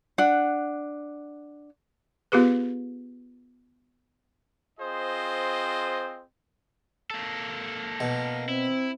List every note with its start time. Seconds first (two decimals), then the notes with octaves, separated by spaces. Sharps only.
0.18 D4 F#5
2.32 B3 F4 G4 G#4 B4
4.80 C4 F4 G#4 C5 D#5
7.11 A#3 A4
8.00 B2
8.48 C4 E4